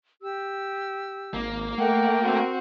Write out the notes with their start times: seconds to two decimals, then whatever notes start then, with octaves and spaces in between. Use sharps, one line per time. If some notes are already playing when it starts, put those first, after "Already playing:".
0.22 G4 E6
1.34 G#1 A#3
1.78 A3 A#4 F#5 G5
2.22 C4 F#4